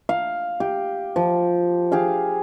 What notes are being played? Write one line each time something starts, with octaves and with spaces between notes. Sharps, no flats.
F5
G4
F3
G4 G#4 F5